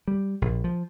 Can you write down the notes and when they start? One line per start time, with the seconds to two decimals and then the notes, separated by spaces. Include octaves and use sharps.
0.08 G3
0.42 A#1
0.64 F3